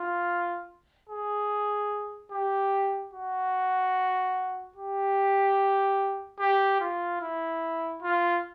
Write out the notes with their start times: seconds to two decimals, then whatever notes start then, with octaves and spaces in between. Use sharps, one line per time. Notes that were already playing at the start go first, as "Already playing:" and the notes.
Already playing: F4
1.09 G#4
2.32 G4
3.14 F#4
4.76 G4
6.40 G4
6.80 F4
7.22 E4
8.03 F4